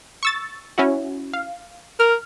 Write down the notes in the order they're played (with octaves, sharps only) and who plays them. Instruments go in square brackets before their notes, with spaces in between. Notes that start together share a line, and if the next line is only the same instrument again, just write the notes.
[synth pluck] C#6 E6 A6
C#4 E4 F#4
F5
[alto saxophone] A#4 [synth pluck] F6